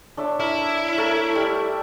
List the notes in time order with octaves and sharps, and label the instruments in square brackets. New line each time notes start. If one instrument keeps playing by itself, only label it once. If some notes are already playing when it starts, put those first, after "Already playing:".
[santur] D4 C#5 E5
[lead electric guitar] E4 [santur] A#4
[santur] A3 A4 A#4
G3